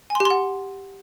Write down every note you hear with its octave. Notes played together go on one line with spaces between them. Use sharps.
G#5
C6
G4
C6
F#5